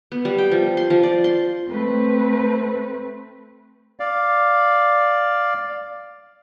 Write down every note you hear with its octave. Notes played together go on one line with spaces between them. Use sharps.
B3
G3
G5
F3
C6
F3
D5
C6
A3 C4 B4
D5 F5